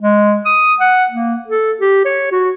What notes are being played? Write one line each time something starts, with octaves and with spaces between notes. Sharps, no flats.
G#3
D#6
F#5
A#3
A4
G4
C#5
F#4